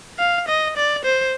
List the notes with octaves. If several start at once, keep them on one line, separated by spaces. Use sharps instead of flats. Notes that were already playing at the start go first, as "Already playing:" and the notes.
F5
D#5
D5
C5